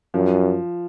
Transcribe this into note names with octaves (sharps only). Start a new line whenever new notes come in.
F#2 F3